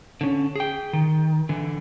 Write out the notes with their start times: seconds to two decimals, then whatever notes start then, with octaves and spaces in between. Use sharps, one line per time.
0.21 D3 C#4
0.56 G#4 G5
0.93 D#3
1.49 D3 E3